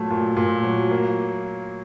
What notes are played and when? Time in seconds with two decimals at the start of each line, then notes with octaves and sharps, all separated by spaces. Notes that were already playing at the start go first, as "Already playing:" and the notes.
Already playing: A#2 F#3 A3
0.10 A#2
0.36 A#2
0.63 F#3
0.91 A#3